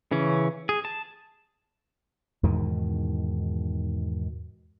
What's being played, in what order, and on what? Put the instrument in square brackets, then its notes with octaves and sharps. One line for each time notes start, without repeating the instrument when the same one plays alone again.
[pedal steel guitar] C#3 E3 C#4
G#4
A5
[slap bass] E2 G#2 B2 D#3